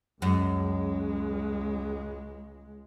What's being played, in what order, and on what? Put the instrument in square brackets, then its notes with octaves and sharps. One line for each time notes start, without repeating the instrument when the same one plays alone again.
[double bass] C#2 G#3 [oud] F#2